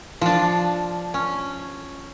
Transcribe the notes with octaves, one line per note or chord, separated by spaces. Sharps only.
F3 D4
C#4